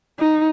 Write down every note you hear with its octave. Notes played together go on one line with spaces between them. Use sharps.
D#4